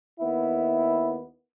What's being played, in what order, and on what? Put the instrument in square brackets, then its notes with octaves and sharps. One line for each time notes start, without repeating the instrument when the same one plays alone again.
[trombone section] D#2 B3 E4